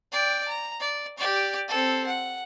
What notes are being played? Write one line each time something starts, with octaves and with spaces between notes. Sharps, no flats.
D5 G5
A#5
D5
G4 D5
C4 A4
F#5